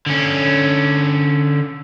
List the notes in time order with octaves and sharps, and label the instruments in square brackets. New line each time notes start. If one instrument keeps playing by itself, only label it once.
[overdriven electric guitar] D3 C#4